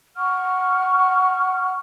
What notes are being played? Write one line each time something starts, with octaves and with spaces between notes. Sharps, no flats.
F#5 C#6 F6